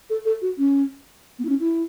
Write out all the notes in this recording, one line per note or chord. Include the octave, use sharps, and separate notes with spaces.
A4
A4
F#4
C#4
B3
E4
C#4
E4